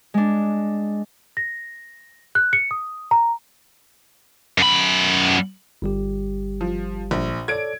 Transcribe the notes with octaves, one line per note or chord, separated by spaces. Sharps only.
G#3 D4
A#6
F#6
C#7
D#6
A#5
F#2 B5
G1 G3 G4
F3
A#1
A4 C#5 D5 G#6 D7